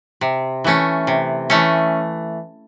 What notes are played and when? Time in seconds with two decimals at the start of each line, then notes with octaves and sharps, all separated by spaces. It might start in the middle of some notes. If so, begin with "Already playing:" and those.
0.21 C3
0.64 E3 A3 C#4
1.07 C3
1.50 E3 A3 C#4